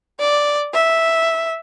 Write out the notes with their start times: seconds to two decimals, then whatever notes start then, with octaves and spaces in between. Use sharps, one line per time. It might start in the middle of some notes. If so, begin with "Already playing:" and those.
0.20 D5
0.74 E5